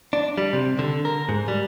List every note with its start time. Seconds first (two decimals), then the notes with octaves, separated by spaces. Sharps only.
0.13 D4
0.38 G3
0.53 C3
0.79 D3
1.05 A#4
1.29 G#2
1.48 G3